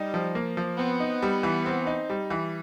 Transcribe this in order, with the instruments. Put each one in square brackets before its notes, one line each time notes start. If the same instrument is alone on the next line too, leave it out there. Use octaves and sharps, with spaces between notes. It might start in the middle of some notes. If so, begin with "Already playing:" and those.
Already playing: [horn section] G3 [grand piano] D#4
[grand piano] F3
A#3
F3
[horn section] B3 [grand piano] C4
[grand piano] D#4
G3
E3
C4
D#4
G3
E3